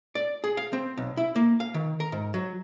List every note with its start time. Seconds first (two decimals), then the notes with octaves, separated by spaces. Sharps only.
0.15 D5
0.44 G#4
0.57 F5
0.73 C4
0.97 B1
1.17 E4
1.36 A#3
1.60 F5
1.74 D#3
2.00 A#4
2.12 G#2
2.34 F#3